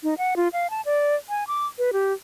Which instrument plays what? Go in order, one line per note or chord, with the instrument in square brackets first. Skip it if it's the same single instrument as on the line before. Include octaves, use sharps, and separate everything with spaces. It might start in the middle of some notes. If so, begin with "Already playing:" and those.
[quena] D#4
F#5
F4
F5
A5
D5
G#5
D6
B4
G4